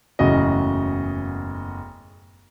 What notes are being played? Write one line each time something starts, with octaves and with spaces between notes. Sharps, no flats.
F#1 E2 A2 C#3 F#4 D#5